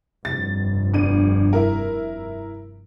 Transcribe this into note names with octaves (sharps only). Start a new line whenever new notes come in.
F1 G2 A6
G1 D#7
E4 A#4